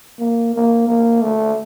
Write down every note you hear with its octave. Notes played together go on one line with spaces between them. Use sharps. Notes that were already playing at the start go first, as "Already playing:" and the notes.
A#3
A#3
A#3
A3